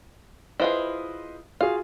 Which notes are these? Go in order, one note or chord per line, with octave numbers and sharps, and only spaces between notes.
E4 F4 G#4 B4 C5 D#5
F4 F#4 G#4 F5